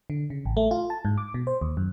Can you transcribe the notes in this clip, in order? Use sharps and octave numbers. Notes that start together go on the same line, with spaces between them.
D3
C#3
A1
A3
F4
A5
G#2
D6
B2
C5
D#2
F#2